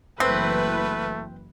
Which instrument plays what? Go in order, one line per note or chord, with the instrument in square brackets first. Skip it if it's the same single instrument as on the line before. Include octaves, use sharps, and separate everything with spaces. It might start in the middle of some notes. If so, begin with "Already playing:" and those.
[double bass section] F#1 E3 [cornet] A3 [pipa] C4 [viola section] B4